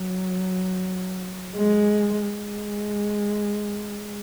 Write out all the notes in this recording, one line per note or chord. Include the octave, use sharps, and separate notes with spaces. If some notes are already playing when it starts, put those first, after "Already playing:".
Already playing: F#3
G#3
G#3